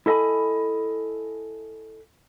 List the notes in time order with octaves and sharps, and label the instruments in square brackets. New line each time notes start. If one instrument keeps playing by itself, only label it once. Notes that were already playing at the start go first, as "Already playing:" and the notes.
[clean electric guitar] E4 A4 D#5 G#5 B5